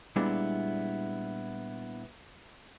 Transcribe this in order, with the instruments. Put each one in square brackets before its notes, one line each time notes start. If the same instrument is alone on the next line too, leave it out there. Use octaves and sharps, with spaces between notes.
[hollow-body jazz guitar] A#2 G3 G#3 B3 D4 E4